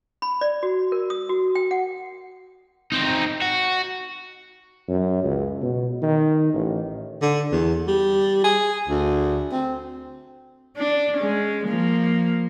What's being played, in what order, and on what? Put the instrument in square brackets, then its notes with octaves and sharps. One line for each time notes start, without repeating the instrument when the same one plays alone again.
[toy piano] B5
D5
F#4
A#4
D#6
F#4
G5
F#5
[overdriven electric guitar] C4 D#4
F#4
[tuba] F#2
C#2
B2
D#3
A1
[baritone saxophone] D3
E2
G3
G#4
D2
C4
[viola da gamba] D4
G#3 C#4
F3 A#3